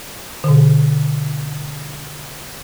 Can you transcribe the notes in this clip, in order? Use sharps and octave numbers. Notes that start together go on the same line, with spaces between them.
B2 D3